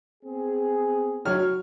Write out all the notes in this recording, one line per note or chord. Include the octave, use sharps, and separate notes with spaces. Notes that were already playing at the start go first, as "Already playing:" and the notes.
B3 C4 G#4
F#3 C#5 F6